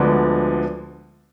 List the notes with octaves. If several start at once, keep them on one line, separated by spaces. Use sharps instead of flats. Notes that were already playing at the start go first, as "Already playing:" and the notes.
Already playing: D2 D3 F3 G#3 B3